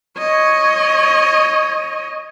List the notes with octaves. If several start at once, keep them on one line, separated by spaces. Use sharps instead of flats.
C#5 D#5